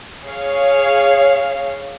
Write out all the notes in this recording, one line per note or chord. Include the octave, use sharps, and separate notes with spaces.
G#4 C#5 F5